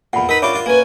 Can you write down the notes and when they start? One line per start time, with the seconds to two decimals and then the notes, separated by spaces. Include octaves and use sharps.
0.13 E2 A#2 F#5 B5
0.29 D#4 A#4 B4 B5
0.42 C#4 D4 F4 C#5 E5 B5 D6
0.54 D4 F4
0.66 A#3 C#4 B4 G#5